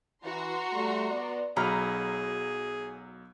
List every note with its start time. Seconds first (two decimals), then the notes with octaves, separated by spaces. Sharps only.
0.24 E3 F#4 A#5 C6
0.72 G3 A3
1.10 B3 D5
1.56 B1 F#3 G#4 D#5 A#5 B5 F6